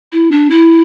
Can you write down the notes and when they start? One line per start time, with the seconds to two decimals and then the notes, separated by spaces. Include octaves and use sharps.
0.12 E4
0.31 D4
0.50 E4